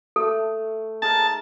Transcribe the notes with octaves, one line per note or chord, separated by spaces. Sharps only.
A3 A4
D#4 G#4 A#4 A5